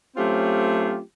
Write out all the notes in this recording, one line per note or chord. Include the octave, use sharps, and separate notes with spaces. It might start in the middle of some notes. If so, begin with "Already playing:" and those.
F#3 A3 C4 C#4 F4 G4